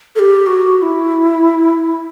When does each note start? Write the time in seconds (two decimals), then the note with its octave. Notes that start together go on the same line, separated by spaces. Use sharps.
0.15 A4
0.19 G4
0.47 F#4
0.77 F#4
0.82 E4